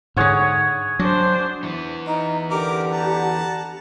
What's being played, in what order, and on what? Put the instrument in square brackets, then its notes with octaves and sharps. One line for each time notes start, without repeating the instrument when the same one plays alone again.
[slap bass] G#2 D3 [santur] G#4 C#5 F#5
[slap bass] F#3 [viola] D4 C5
[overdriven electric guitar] E3 B3
[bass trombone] D#4 [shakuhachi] A#5
[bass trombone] D3 [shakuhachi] G4 [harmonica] A#4 D6
[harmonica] F#5 A5 A#5